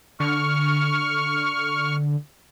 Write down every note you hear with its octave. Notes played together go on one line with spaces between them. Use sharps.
D3 C#6 F6